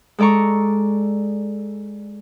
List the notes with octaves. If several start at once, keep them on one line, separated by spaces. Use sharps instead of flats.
G#3 A4 D5 A#5 C#6